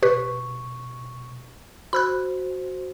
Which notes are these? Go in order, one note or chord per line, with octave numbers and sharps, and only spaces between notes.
B2 G4 B4 C#6
F#4 C5 B5 E6 F#6